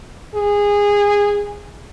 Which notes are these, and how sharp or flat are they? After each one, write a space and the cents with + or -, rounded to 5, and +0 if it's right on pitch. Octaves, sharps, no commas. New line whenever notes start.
G#4 -20